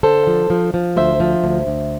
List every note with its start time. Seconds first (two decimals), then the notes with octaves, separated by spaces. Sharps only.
0.03 D3 A4 C5
0.27 F3
0.50 F3
0.74 F3
0.96 D2 C5 E5
1.20 F3
1.44 D2
1.67 D2